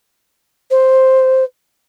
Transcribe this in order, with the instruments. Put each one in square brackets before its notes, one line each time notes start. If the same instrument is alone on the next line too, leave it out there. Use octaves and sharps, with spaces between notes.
[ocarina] C5